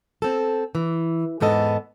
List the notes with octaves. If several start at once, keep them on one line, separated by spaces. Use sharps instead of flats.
C4 A4
E3
E2 G#2 B3 A4 D#5